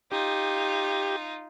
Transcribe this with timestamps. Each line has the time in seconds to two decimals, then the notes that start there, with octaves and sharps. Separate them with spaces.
0.12 D#4 F4 G4